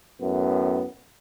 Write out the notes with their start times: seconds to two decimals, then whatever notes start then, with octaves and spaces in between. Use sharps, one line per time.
0.21 F#2 A2 B3